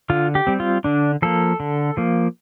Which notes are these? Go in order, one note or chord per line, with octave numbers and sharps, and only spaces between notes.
D3 F4
G4
G3 C4
F4
D3 D4
F3 A#3 A4
D3
F3 A#3